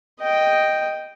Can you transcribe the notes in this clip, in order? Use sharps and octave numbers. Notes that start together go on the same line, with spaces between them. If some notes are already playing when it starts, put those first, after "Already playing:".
D#5 G5